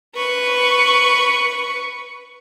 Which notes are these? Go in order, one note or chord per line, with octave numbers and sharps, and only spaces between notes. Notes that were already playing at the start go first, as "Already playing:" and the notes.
B4 C#6